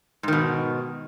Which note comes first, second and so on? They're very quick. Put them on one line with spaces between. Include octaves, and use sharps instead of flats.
G#2 D#3 B2